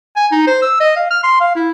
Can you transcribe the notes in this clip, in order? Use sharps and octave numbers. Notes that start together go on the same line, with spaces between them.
G#5
D#4
C5
E6
D#5
F5
F6
C6
F5
E4